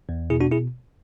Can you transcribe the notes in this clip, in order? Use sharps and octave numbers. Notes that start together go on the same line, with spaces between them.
E2
B2 E4 G#4
D4 F#4
E4 G#4